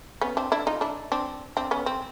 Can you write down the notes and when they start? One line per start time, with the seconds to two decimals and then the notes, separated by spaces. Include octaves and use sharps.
0.21 B3 C#4
0.37 C4 D4
0.52 D4 E4
0.67 D#4 F4
0.81 D4 E4
1.12 C4 D4
1.57 C4 D4
1.71 B3 C#4
1.86 C4